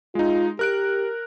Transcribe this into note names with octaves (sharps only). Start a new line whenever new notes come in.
G#3 D#4 F4
G4 A#4 F#6 D7